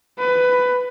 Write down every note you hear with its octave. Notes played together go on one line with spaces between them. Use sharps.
B4